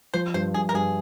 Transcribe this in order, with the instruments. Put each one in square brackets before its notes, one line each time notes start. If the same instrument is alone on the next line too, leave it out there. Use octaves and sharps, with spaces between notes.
[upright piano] F3 [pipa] C5
[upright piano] G2 [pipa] C5
[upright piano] G2 [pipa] G#4
[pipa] A#4
[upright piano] G2 [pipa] G#4